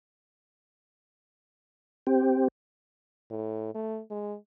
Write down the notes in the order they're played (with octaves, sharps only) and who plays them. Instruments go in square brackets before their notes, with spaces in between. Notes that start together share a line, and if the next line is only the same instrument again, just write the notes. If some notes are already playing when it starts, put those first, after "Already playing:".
[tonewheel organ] C4 G4
[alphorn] A2
A3
G#3